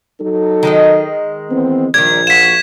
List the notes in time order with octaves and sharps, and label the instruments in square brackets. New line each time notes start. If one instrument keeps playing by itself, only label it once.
[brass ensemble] F#3 D#4 A4
[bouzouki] D#3 G#3 D#5
[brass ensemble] E3 B3 C4
[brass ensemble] A#1 [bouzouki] D#3 G3 [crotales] G#6
[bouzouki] F4 F#4 [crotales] B6 E7